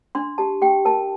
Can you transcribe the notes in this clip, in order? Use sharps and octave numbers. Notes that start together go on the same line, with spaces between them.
D4 C6
G4 A5
G4 G5
A#4 A5